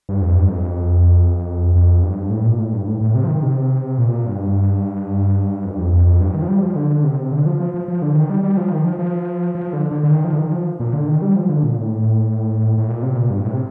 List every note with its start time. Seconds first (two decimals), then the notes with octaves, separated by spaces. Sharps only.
0.09 G2
0.22 F2
0.37 G2
0.50 F2
1.75 F2
2.03 G2
2.31 A2
2.45 A#2
2.59 A2
2.73 G2
2.87 A2
3.01 A2
3.15 C3
3.24 F3
3.29 D#3
3.43 C3
3.98 A#2
4.26 G2
5.65 F2
5.72 G2
5.79 F2
5.93 F2
6.07 F2
6.20 G2
6.34 D#3
6.42 F3
6.49 G3
6.63 F3
6.76 D3
7.04 C3
7.32 D3
7.46 F3
7.60 F3
7.74 F3
7.88 F3
8.02 D3
8.15 D#3
8.30 G3
8.43 G3
8.57 F3
8.71 D#3
8.85 F3
8.99 F3
9.55 F3
9.73 D3
9.91 D3
10.03 D3
10.10 D#3
10.24 F3
10.33 D3
10.38 D#3
10.52 F3
10.80 A#2
10.93 D3
11.07 D#3
11.22 G3
11.36 F3
11.49 D3
11.63 A#2
11.77 A2
12.78 A2
12.88 A#2
13.02 C3
13.16 A#2
13.30 G2
13.44 A2
13.53 C3